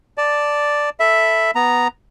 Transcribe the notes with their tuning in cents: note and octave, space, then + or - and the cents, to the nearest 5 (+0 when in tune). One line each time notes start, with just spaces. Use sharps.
D5 +0 A5 +0
A4 +0 E5 +0 B5 +0
B3 +0 A#5 +0